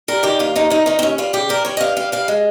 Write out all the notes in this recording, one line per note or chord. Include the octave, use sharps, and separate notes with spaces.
G3 A#4
D#3 G4
D#2 F4
D#2 D#4
D#3 D#4
D#3 D#4
C4
D#2 C#4
G3 F4
C#3 G4
G3 A#4
G3 C#5
D#5
G2 F5
G3 F5
G3 F5
G#3